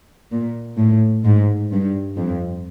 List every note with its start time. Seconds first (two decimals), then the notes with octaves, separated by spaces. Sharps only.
0.31 A#2
0.78 A2
1.24 G#2
1.71 G2
2.17 F2